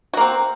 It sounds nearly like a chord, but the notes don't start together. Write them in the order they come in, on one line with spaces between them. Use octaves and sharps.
F#4 A#3 C4